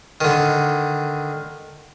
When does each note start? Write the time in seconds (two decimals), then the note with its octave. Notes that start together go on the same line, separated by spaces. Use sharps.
0.21 D3 D#3